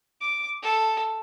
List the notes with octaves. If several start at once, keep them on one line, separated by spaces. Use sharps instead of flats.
D6
A4